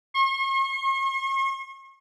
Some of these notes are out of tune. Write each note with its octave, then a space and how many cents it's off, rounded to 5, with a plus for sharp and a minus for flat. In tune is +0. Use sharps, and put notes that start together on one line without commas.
C#6 -45